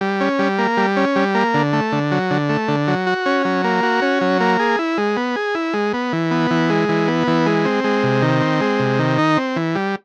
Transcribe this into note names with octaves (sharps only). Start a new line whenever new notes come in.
G3
C#4
G3
A#3
G3
C#4
G3
A#3
D3
A3
D3
F#3
D3
A3
D3
F#3
F#4
C#4
F#3
A#3
F#4
C#4
F#3
A#3
G#4
E4
G#3
B3
G#4
E4
G#3
B3
E3
B3
E3
G#3
E3
B3
E3
G#3
C4
G#3
C3
D#3
C4
G#3
C3
D#3
D#4
C4
E3
G3